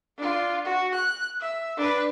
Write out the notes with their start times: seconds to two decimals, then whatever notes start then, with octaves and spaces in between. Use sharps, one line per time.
0.17 D4 F4
0.65 F#4
0.95 F#6
1.40 E5
1.77 D4 B4